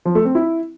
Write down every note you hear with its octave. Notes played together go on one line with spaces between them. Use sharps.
F3
A3
C4
E4